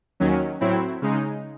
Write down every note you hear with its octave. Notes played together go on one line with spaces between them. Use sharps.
D#2 D#3 F#3 C#4
A2 F#3 C4 E4
C#3 G#3 D#4